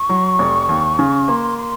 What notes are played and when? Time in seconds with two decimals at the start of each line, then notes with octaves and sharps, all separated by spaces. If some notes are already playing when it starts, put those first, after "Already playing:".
Already playing: C#6
0.09 F#3
0.39 F1
0.69 D#2
0.99 C#3
1.28 A#3 C6
1.58 C6